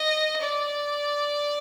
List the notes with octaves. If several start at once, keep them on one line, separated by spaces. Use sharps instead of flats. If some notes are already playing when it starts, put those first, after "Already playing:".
Already playing: D#5
D5